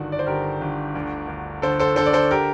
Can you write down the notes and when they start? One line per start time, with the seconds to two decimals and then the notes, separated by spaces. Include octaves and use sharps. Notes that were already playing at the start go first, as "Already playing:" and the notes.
Already playing: G1 D#3 D4 F#4
0.12 D5
0.19 C5
0.27 G1 G4 A#4
0.61 G1
0.95 D2
1.28 D2
1.62 D3 A4 C5
1.79 A4 C5
1.96 D3 A4 C5
2.06 D5
2.13 A4 C5
2.31 G4 A#4